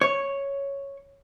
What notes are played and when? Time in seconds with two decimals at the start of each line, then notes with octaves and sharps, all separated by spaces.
0.01 C#5